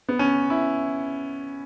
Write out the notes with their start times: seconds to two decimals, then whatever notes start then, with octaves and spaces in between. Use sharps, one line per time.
0.09 B3
0.19 C#4
0.50 E4